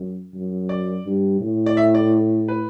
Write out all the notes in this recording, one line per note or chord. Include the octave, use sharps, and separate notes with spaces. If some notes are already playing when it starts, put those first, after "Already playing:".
Already playing: F#2
F#2
D5
G2
A2
D5
E5
D5
B4